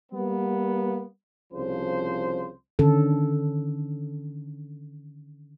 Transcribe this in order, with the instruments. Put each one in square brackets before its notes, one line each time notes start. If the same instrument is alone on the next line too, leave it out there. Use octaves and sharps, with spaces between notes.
[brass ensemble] G3 A#3 B3
C2 C#3 F3 C5
[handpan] D3 D#3 C#4 A4